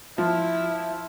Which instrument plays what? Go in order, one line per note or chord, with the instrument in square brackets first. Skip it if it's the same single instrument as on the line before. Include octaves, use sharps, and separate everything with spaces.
[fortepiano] F3 [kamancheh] E4